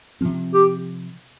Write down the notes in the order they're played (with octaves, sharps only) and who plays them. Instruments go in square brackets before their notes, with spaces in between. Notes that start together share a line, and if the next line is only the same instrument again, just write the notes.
[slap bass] C3 F3 C4
[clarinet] G4